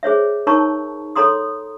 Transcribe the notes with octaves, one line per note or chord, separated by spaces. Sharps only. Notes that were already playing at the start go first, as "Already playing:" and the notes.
G#4 C5 C#5 E5
D#4 A#4 C#5 A5 A#5 C#6
A4 C#5 A#5 C6 D#6